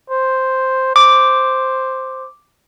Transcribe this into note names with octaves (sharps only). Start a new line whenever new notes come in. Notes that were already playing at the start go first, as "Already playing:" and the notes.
C5
C5 D6